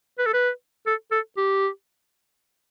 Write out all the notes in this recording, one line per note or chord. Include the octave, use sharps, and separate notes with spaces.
B4
A4
B4
A4
A4
G4